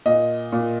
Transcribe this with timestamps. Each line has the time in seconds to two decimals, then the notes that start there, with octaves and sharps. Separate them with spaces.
0.06 A#2 D#5
0.52 A#2